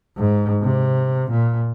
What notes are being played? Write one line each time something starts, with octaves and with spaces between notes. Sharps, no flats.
G#2
C3
A#2